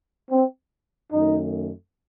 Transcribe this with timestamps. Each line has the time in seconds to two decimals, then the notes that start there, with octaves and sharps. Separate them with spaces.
0.31 C4
1.12 F#2 D#3 A3 D#4